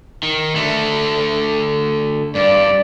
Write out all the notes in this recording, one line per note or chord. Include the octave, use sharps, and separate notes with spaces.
D#3
D3 A3
G2 D5